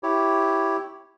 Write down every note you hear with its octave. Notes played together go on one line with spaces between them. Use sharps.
E4 G4 C#5